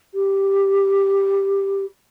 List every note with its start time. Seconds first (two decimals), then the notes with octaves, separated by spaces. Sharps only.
0.14 G4